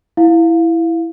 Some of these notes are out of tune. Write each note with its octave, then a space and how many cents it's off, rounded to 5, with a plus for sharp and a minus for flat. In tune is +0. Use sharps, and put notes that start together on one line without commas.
E4 +5 F5 +10